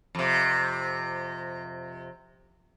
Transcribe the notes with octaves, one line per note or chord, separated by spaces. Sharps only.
F2 C3